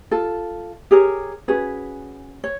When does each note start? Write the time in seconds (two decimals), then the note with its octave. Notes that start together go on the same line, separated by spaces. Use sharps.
0.11 F4 A4
0.91 G4 G#4 A#4 C#5
1.48 C#4 F#4 G#4 B4
2.44 C#5